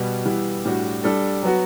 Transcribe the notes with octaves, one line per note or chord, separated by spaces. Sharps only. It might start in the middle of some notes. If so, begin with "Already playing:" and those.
Already playing: B2 G3 B3
E3 G3 B3 E4 G4
A2 G3 D4 F#4
G3 D4 A4
F#3 B3 F#4